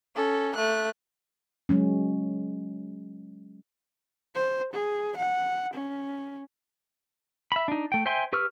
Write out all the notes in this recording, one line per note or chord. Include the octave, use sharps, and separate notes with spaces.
C#4 A4
A3 F#6
F#3 G#3 C#4
C5
G#4
F#5
C#4
E5 B5
D4 D#4
A3 G5
C5 E5 G5 G#5 C6
G4 B4 C#6 E6 F6